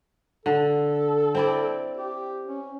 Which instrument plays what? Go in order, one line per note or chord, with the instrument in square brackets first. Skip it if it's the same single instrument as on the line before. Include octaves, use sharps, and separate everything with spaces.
[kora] D3 [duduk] A4
[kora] C4 E4 D5
[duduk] G4
C#4